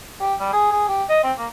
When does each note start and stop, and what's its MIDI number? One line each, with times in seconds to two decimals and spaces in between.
0.20 0.34 67
0.40 0.51 55
0.53 0.71 68
0.71 0.86 68
0.88 1.03 67
1.09 1.23 75
1.24 1.32 60
1.38 1.47 58